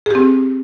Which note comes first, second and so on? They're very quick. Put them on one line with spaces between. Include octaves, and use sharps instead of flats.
G#4 G4 C4